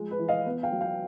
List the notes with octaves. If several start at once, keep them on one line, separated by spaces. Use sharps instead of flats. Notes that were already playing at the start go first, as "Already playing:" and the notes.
Already playing: F3 G#3
B4
E3
D#5 F5
B3
F5 G5
F#3
F5 G5